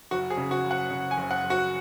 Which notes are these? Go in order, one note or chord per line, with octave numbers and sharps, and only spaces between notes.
F#1 F#4
G#4
C#3
F#4
F#1
F#5
C#3
G#5
F#1
F#5
F#1
F#4